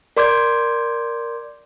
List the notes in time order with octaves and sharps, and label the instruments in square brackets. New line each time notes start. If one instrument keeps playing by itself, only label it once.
[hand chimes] A#4 D5 C6 D6 G6 G#6